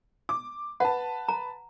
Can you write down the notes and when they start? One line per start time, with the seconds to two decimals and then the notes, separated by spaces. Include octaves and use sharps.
0.29 D6
0.80 B4 F#5 A5
1.28 A#5